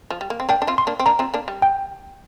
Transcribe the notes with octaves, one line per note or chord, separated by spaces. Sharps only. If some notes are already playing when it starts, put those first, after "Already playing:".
F3
G3
A#3
C4
A#3 D4 G5
D4
C4 F4
C6
A#3 D4
C4
A#3 D4 A#5
C4 F4
A#3 D4
G3
G5